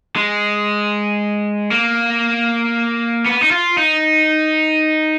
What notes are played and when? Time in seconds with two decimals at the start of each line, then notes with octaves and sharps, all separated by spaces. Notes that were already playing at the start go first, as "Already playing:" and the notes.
0.16 G#3
1.71 A#3
3.26 B3
3.42 D#4
3.51 F4
3.78 D#4